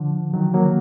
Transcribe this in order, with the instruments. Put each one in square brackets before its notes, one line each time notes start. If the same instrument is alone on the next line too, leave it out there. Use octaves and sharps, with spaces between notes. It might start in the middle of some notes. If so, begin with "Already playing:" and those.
Already playing: [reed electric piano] D3 F3
D#3 F#3
F#3 A#3